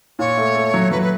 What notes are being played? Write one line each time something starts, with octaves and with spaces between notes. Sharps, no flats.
A#2 C#5
A3
A3
F#3
F#3 B4
B4